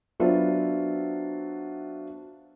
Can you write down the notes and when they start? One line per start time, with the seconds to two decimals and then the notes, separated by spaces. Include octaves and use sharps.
0.20 F#3 B3 D4 F4 C5 E5